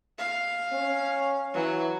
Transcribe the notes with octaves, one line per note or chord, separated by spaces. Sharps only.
F5
C#4
E3 F#3